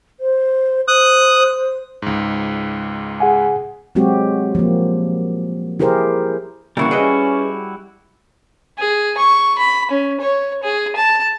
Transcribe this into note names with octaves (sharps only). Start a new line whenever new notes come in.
C5
C5 D#6 F#6
C#2 G#2
G#4 F#5 G#5
F#3 G#3 C4 F#4 G4
F3 A#3
E4 G4 G#4 A#4 C5
A#2 C#3 E3 G3 E4 F#4
C#4 G#4 B4 D#5
G#4
C#6
B5
C#4
C#5
G#4
A5